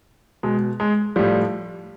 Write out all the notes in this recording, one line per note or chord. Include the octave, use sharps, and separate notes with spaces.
B2 G#3
G#3
A2 F3 G3